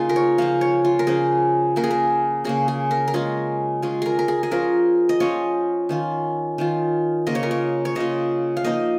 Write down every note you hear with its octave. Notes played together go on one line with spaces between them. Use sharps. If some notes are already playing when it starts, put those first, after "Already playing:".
Already playing: C#3 A#3 D#4 F4 G#4
A#4
C#5
C#3 F3 C#4 F5
C#5
F4
A#4
C#3 F3 C#4 G#4
C#3 A#3 C#4 A#4
G#4
A#4
C#3 A#3 C#4 G#4
G#4
A#4
A#4
G#3 C#4 F4 G#4
G#3 C#4 F4
G#4 A#4
A#4
G#4
G#4
F3 C#4 F4 A#4
D#5
F3 C#4 F4 C#5
D#3 C#4 F4
D#3 C#4 F4
C#3 A#3 F4 D#5
C#5
A#4
C#5
C#5
C#3 A#3 F4 D#5
F5
F3 A#3 D#4 D#5